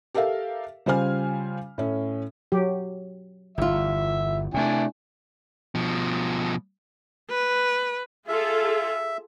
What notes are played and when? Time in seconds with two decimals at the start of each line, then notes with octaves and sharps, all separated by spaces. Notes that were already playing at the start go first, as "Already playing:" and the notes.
0.14 G4 A4 A#4 E5 F5
0.86 C#3 G3 F4 C5 G#5 F6
1.78 A2 C#4
2.52 F#3 G4
3.58 G1 E2 F4 E5
4.54 C3 A3 D4 E4 G#5
5.75 B2 F3
7.30 B4
8.28 F4 G#4 A4 E5